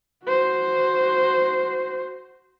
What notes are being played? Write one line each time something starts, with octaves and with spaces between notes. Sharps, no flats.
F#4 C5